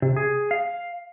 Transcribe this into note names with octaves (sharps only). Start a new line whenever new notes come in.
C3
G#4
F5